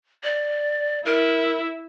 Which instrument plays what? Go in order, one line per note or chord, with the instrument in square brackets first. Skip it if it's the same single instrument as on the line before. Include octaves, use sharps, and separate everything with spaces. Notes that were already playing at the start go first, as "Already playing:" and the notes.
[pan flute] D5
[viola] E4 [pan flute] A#4